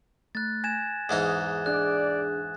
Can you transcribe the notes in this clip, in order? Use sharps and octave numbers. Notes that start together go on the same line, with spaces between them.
A3 F#6 A6
G#5 G#6 A#6 E7
E2 G#2 D#4 D#6 F#6
D4 G#4 D5 F#6